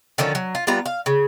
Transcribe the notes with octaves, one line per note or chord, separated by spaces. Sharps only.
D3 D#3 F3 C#4
F#3
F4
G3 B3 F4 A#5
F5
C#3